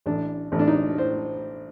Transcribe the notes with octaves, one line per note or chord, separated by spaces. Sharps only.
A1 D4
A1
D4
D#4
A2 C5